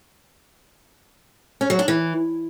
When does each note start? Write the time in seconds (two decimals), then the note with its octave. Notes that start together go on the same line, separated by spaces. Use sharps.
1.61 C#4
1.70 F#3
1.79 D4
1.88 E3